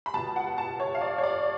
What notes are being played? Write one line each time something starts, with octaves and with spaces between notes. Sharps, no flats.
B5
C#2 B2 A5
F#5
A5
C#5
F5
D5
C#5
D5